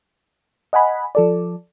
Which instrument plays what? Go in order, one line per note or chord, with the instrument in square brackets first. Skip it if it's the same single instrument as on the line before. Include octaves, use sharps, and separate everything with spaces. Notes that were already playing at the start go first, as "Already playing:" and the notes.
[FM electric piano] D#5 F#5 G#5 B5
F3 A4 D5